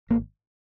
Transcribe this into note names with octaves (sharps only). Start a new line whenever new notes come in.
G#1 A#3